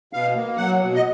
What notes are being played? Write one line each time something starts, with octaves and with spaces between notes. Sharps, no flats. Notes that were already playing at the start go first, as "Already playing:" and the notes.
B2 F5
A#3
F#3 F#5
B2
D#5